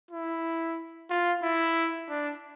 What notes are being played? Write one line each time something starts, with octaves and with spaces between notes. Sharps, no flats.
E4
F4
E4
D4